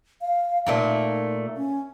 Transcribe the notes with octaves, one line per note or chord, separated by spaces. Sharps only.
F5
A#2 A3 A#3 D#4
C#4